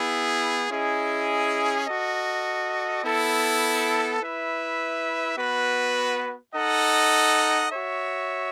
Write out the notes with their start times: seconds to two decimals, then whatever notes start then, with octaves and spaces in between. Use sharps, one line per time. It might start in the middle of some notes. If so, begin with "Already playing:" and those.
Already playing: B3 E4 G#4
0.69 C#4 E4 G#4 D#5
1.86 F#4 A4 D#5
3.03 B3 E4 A4
4.20 E4 B4 E5
5.37 B3 F#4 B4
6.54 D#4 A4 D#5 F#5
7.71 F#4 C#5 E5